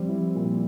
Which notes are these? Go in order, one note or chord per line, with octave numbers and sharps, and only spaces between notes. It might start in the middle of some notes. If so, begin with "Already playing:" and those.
Already playing: F3 G3 C4
E4
A#2